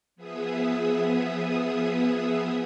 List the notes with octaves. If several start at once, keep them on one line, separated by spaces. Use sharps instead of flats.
F3 B3 G#4 E5 D#6